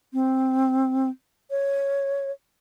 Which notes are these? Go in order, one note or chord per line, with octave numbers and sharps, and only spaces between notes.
C4
C#5